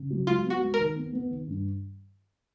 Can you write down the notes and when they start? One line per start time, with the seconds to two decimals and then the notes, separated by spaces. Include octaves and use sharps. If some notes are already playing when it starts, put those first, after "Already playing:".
Already playing: C#3
0.10 F#3
0.27 G#3 F4
0.45 B3
0.50 F#4
0.62 G#3
0.74 A#4
0.79 D#3
0.96 B3
1.13 B3
1.30 D#3
1.47 G2